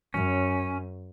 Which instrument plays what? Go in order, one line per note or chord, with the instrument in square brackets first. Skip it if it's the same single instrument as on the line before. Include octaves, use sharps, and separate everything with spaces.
[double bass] F#2 [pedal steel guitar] C#4